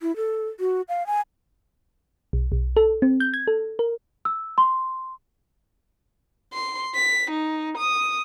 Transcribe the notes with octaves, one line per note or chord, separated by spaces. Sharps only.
E4
A4
F#4
F5
G#5
B1
B1
A4
C4
G6
G#6
A4
A#4
E6
C6
C6
B6
D#4
D#6